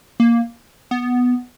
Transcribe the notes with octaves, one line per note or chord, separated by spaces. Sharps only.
A#3
B3